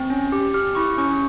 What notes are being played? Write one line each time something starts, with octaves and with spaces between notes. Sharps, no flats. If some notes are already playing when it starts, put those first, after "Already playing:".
Already playing: C4
C#4
G4
G4 F6
E4 C#6
C#4 C#6